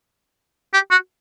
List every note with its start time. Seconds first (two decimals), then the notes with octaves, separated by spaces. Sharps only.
0.74 G4
0.91 F#4